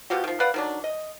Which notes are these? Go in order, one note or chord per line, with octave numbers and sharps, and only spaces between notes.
B2 F3 F#4 G4
D#3 F3
B4 D5 F5 F#5
D#3 F#3 D4
D#5